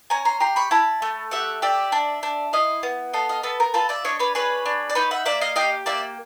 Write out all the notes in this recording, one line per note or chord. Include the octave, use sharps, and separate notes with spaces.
C#4 G#5 A#5
A#5 C6
G4 A#5 C6
B5 C#6
E4 A5 B5
A3
G4 E5 F#5
G4 D5 E5
D4
D4
E4 D#5 F5
B3
A4 D#5 F5
D#5 F5
B3 A4 B4
A#4
F4 A4 B4
D5 E5
D4 C#5 D#5
B4 C#5
G#4 B4 C#5
D4
D5
D#4 B4 C#5
E5 F#5
A#3 D5 E5
D#5 F5
G4 D#5 F5
A#3 D5 E5